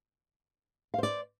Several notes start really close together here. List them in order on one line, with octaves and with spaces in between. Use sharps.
F5 C5 D5